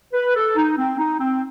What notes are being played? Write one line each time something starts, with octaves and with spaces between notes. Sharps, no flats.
B4
A4
D#4
C4
D#4
C4